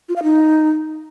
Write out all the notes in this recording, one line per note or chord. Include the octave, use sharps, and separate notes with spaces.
F4
F5
D#4